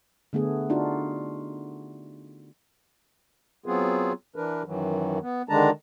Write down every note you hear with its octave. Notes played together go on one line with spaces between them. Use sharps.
D3 A3 B3 G#4
D4 D#4 F4 F#4
F#3 B3 C4 F4 G#4
E3 D4 A#4 B4
F#2 D#3 E3 F#3
B3
D3 D#3 G#3 D4 A5 A#5